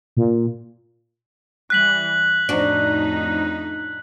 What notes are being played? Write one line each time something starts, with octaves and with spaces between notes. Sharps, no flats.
A#2
E3 G3 F#6 B6 F#7
F2 A2 D4 D#4 F#4